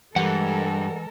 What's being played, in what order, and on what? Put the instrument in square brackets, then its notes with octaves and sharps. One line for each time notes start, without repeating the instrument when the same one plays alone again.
[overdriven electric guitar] G2 [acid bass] E3 [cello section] G#3 A4 A#4 [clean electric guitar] F#5